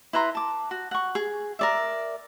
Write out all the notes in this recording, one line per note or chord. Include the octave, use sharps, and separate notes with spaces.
E4 B4 A#5 C6
A5 D6
F#4
F#5 C#6
G#4
A#4 D5 E5